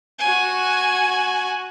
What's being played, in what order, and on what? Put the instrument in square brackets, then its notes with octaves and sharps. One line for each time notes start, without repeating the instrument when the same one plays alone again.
[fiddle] F#4 G#5